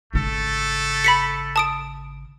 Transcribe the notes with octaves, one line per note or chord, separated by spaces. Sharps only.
G#1 C#3 A3 A4
B5 B6 C#7
A5 D#6 D7